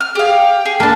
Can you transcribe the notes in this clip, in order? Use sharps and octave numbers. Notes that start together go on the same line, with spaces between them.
F6
G4 G#4 F5
G5
G#4
A#3 D4 A5 B5